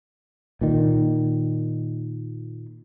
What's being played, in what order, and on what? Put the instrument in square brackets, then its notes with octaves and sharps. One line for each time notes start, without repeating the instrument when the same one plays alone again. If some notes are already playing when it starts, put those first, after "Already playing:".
[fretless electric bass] A#2 D#3